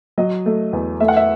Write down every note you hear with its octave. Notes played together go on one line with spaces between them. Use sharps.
F#3 D#5
A3
E2
A3 E5
F#5
E5